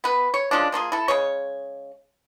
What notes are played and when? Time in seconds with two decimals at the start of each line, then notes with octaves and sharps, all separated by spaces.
0.04 B3 B4
0.34 C#5
0.51 F3 G#3 C#4 D4
0.72 F3 A#3 F4 G#4
0.92 E4 A4
1.08 C#3 G#3 C#5